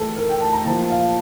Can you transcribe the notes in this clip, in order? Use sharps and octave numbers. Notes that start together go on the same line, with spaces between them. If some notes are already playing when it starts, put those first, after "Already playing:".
Already playing: A2 E3 A4
A#4
G5
A5
A#5
A#2 F3 A5
F5